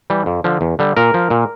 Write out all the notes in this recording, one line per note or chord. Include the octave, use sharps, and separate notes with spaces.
E3 G3
F2
D3 F3
E2
D3 G3
A#2 A#4
F3
A#2